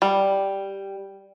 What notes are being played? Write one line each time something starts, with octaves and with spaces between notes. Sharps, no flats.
G3